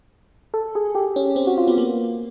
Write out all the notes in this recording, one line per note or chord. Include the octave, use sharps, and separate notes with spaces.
A4
G#4
G4
C#4
C4
F#4
F4
B3
A#3